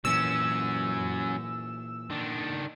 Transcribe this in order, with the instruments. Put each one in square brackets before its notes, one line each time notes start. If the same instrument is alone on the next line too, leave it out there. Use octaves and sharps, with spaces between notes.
[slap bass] A#2 E3 [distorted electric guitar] F#3 C#4 [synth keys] E6
[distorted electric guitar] D#3 D4